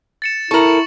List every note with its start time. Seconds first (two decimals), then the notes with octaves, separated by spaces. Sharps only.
0.22 A6 C#7 E7
0.51 E4 A4 A#4 C#6 F#7